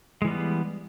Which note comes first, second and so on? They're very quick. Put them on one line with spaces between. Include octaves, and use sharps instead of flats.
G#3 E3 G3 B3